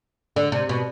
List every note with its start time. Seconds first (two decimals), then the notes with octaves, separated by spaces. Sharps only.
0.36 D3
0.52 C3
0.69 B2